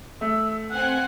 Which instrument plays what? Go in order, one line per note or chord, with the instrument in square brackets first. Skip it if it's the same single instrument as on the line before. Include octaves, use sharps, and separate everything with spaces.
[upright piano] A3 [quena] E6
[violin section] C4 F#5 G#5 [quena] F#6